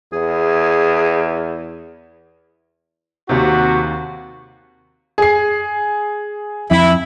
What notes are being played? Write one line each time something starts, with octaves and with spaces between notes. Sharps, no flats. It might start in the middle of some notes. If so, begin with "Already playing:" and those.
E2 G#4
D#2 C3 D#3 F#4
G#4 C7
F2 E4